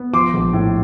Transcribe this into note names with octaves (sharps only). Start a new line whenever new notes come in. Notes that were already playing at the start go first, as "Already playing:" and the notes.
Already playing: B3
F3 C6 D6
A#1
A2